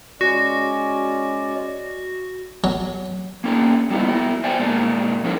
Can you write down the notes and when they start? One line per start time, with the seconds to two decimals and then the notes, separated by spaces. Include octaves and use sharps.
0.21 G#3 C#4 F#4 D5
2.64 F#3
3.44 A#3 C#4 D4 G#4
3.90 F#3 G3 B3 E4 D#5
4.05 B3 E4 F#4
4.44 C5 D5 G5 G#5
4.60 A#2 G#3 A#3 D4
5.24 F3 C#4 E4 F#4 G#4 A#4